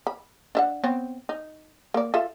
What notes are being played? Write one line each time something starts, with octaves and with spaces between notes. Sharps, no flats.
B5
D4 E5 F#5
B3 C4 C#5
D#4
A#3 D5
F4 A4 E5